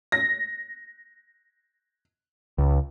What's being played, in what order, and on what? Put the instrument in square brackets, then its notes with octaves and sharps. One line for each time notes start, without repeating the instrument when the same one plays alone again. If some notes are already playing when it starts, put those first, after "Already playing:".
[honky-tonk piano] A#6
[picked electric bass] C#2